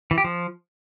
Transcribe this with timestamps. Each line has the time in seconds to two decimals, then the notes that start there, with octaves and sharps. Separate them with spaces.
0.11 E3
0.18 G4
0.24 F3